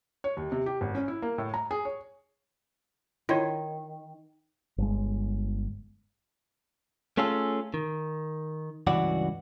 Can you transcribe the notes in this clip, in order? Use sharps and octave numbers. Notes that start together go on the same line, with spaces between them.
C#5
D#2
C3
G4
G#1
C#4
E4
A#3
A2
A#5
G#4
C#5
D#3 E4 F4 C#5
G1 G#3
A3 C#4 F4 G#4 A4
D#3
C#2 G2 E3 F#4 D5 F#5